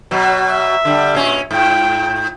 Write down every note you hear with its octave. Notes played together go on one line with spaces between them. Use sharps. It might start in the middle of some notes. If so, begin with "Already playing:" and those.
B2 F#3
E5
D3 G3
A#2 C#4
G#2 F4 G5